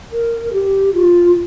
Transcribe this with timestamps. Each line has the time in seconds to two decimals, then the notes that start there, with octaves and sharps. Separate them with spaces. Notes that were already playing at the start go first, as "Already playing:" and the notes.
0.13 A#4
0.53 G4
0.94 F4